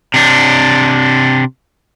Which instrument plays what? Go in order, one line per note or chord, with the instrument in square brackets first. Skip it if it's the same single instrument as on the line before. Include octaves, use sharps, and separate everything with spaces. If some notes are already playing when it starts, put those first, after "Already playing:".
[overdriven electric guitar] C3 D4